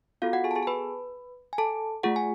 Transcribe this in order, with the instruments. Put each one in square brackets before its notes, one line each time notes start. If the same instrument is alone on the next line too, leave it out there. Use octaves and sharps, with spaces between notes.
[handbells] B3 F4 F#4 A4 F5
F#4 F#5
G#4 G#5
A5
G#4 G#5
A5
B4 B5
G#5
A4 A5
A3 F4 G#4 F#5
G#5